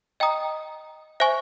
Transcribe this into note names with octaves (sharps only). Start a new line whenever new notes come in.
D#5 G5 A#5 D#6
C5 E5 G#5 C#6